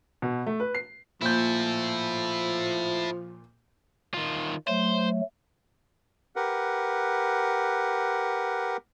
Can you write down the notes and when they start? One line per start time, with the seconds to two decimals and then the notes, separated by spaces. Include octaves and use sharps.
0.22 B2
0.46 A3
0.60 B4
0.75 C7
1.22 A#2 F3 E4 A4 G6
4.14 D#3 F4
4.68 F#3 A3 C5
6.36 G4 A#4 B4 F#5